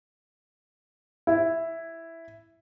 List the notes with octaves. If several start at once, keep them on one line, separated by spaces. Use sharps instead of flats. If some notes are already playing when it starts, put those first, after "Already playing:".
E4